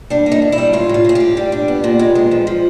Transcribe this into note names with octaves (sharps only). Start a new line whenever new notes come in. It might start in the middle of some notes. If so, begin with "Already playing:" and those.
G3 D4
A#3
D#4
D4
E4
G3
A2 F4
A2 F4
A2 G#4
A2 G4
G3
D4
B3
A#2
G#3
G#3
F3
F3